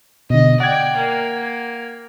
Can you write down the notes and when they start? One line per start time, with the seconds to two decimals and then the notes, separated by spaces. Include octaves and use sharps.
0.30 B2 D3 D#5
0.60 D5 F#5 G5 G#6
0.97 A#3